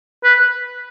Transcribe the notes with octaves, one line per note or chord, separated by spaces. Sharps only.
B4